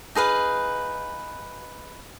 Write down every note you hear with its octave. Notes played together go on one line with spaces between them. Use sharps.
D#4 G#4 B4 F5